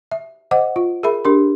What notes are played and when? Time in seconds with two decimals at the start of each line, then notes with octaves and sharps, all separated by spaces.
0.11 E5
0.51 C5 D#5 F#5 D6
0.76 F4
1.03 G#4 A#4 E5 B5
1.25 D4 G4 A#4 C6